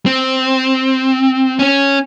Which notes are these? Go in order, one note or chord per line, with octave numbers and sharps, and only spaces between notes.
C4
C#4